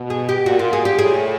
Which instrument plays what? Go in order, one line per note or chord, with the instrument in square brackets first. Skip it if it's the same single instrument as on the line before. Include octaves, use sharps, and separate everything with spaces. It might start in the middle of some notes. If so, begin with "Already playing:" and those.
Already playing: [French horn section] B2
[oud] G#4
G4
[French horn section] A#2 [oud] F#4
[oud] F4
G#4
G4
[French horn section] A2 [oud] G#4